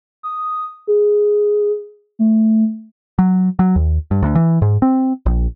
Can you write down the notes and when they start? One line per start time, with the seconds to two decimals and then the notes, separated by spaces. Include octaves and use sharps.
0.23 D#6
0.87 G#4
2.19 A3
3.19 F#3
3.59 F#3
3.76 D#2
4.11 G2
4.23 D2
4.35 E3
4.62 G#2
4.82 C4
5.26 A#1